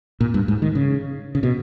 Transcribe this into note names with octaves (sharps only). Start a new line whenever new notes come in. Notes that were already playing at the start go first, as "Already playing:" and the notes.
A#2
G2
G#2
D#3
C#3
C#3
B2